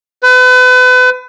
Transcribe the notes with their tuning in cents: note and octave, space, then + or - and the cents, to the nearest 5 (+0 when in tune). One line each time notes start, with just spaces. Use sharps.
B4 +35